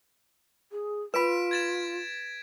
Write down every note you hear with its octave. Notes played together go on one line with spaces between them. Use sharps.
G#4
F4 B4 B5 B6 D7 E7
G#6 A6 E7